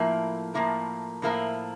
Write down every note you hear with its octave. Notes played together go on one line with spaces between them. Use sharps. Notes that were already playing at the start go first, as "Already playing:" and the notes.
Already playing: A2 F3 A#3 E4 A#4
A2 F3 A#3 E4 A#4
A2 F3 A#3 E4 A#4